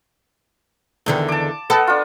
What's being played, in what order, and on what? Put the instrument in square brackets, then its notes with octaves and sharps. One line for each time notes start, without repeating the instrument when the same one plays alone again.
[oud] E2 D3 D#3
[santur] A5 D6
[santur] B3 D#5 F#5 [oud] A4
[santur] D4 F4